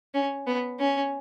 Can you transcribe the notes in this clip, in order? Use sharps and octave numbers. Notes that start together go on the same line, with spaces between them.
C#4
B3
C#4